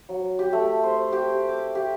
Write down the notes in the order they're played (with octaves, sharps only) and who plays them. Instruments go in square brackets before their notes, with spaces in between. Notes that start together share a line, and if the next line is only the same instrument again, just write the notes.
[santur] F#3
G4
A3
C5
G4
D6
G4